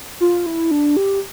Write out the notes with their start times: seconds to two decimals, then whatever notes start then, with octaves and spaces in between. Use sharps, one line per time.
0.20 F4
0.46 E4
0.71 D4
0.97 G4